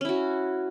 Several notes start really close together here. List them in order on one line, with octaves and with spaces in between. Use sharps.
C#4 E4 F#4